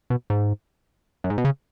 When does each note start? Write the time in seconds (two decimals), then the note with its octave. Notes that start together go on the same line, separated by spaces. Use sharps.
0.10 B2
0.30 G#2
1.24 F#2
1.30 G#2
1.38 B2
1.45 C#3